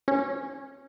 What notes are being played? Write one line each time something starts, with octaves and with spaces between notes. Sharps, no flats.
C#4